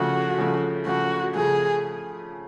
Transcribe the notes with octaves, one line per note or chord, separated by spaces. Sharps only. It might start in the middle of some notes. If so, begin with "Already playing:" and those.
Already playing: C#3 F3 A3 F#4
C#3 F3 A3
C#3 F3 A3 F#4
C#3 F3 A3 G#4